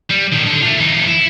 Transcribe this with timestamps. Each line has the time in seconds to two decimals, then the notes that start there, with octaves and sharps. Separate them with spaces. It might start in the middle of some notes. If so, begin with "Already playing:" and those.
0.10 G3
0.32 A2 D#3
0.46 D3
0.62 A3 F4
0.80 E2 D#4
1.08 E4